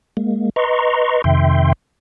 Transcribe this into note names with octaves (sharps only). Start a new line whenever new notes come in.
G#3 A#3
B4 D#5 A#5 C6 C#6
F2 C3 D#3 E5 G5 C6